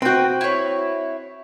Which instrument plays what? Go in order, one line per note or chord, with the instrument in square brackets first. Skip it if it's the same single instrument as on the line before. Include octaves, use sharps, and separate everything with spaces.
[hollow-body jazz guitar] C4 F#4 [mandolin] B4 G5
[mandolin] E4 C#5